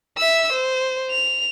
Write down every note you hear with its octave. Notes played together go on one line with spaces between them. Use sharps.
E5 E6
C5
F7